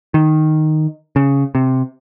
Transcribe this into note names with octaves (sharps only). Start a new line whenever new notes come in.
D#3
C#3
C3